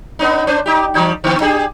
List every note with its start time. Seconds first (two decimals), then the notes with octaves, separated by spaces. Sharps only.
0.19 B3 C#4 D#4
0.47 C#4 D4 C5
0.66 D#4 G4
0.94 E3 G3 D#4
1.24 D3 B3
1.40 D4 G4 G#4